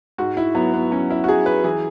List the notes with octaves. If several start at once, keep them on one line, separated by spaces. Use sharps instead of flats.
G#2 F#4
E4
F#3 B3
B3
F#3 C#4
E4
F#4
F#3 G#4
B4
E3 G#4